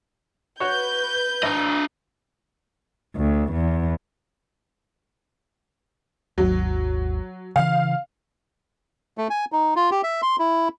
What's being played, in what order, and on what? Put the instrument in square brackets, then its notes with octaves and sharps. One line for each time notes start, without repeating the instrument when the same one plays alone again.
[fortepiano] F#4 C#5 [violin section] B4 G6
[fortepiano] G#1 [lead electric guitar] D4 D#5
[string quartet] D2
E2
[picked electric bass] G#1 D#2 [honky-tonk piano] F#3
[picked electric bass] C#3 E3 [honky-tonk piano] F5
[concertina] A3
G#5
D#4
F4
G4
E5
C6
E4